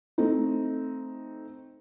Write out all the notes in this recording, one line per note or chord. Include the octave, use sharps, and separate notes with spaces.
A3 C4 D#4